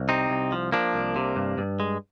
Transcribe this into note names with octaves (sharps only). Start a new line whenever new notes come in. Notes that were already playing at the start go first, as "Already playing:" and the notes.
Already playing: C2
C3 C4 D#4
C2
F3
F3 A#3 D4
C2
C3
G2
G2
G#3